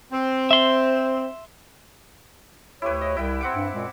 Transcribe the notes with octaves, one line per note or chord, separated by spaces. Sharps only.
C4
E5 C6
D2 E4 G4 B4 C#5
D#5
C2 E4 G5
C4 F#5 D6
G2
F#2 A#2 G#3